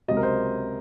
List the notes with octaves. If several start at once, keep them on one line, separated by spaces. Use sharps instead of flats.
C#2 C3 F#3 D#5
A#4
C5